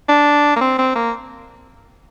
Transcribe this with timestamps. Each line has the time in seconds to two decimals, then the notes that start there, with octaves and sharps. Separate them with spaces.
0.09 D4
0.56 A#3
0.61 C4
0.78 C4
0.96 A#3